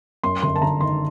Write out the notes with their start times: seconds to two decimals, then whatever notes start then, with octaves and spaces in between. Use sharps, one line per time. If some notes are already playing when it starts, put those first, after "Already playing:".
0.24 F#2 C6
0.42 G1 C6
0.56 A5
0.62 G1 A#5
0.81 D#3 C6